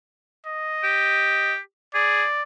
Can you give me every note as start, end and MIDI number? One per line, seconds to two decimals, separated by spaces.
0.46 1.53 75
0.84 1.58 67
1.95 2.25 68
1.95 2.43 74